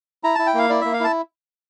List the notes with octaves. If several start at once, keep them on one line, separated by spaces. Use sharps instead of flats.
E4 A#5
E4 A5
G5
A#3 F5
E4 D5
A#3 E5
F5
E4 A5